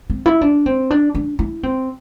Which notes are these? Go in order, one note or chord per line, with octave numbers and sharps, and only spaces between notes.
C4
E4
D4
C4
D4
D4
E4
C4